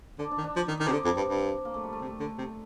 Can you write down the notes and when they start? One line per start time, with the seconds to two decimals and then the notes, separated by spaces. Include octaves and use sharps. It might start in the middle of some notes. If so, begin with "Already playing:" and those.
0.19 D3 D4
0.31 D4
0.38 D#3
0.44 D4
0.56 F3 D4
0.68 D#3 D#4
0.79 D#3 D4
0.88 C3
0.92 D3 C4
1.05 F2
1.17 G2
1.28 G2
1.65 A#3
1.74 A3
1.84 G3
1.93 A3
2.01 C3
2.20 D3
2.38 C3